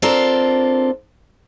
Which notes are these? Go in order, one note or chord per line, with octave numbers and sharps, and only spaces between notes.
C4 D4 F4 A4 A#4